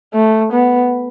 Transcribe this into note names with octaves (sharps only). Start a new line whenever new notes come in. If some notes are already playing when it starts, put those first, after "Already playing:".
A3
B3